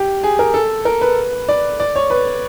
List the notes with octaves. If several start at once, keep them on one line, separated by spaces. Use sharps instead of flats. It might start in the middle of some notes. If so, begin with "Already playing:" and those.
Already playing: G4
G#4
A#4
A4
A#4
B4
D5
D5
C#5
B4